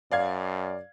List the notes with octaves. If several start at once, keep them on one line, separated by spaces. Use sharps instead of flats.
F#2 D5 F5 G#6